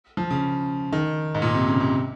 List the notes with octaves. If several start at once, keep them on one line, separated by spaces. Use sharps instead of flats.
F3
C#3
D#3
G#2
A#2
C3
C#3
C3